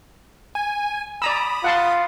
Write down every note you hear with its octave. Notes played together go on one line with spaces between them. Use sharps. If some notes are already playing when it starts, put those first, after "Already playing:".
G#5
D5 A#5 B5 D#6 E6
F4 F#5 A5 C6